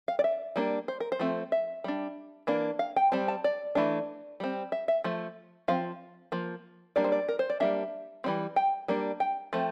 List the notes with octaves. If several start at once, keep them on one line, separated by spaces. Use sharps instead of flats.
F5
D5
E5
G3 A#3 D4
C5
A#4
C5
F3 A3 C4
E5
G3 D4
E3 A#3 D4
F5
G5
G3 C4 A5
A5
D5
E3 A3 D4
G3 C4
E5
E5
F3 A3
F3 C4 F5
F3 A#3
G3 A#3 D4 D5
C5
D5
A#4
C5
D5
G3 A#3 D4 E5
E3 G3 C4
G5
G3 A#3 D4
G5
F3 A3 C4